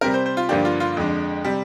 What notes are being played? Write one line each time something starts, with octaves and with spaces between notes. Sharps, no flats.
C3 G3 C4 A#4
C5
C5
F4
G2 D3 F3 A#3 D4 G4
F4
F4
F2 D3 G#3 D4
C3 G3